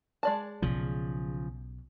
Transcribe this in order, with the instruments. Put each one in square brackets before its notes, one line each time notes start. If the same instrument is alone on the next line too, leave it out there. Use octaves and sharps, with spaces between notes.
[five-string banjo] G#3 D5 A5
[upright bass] B1 F#3 [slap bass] C#3 F3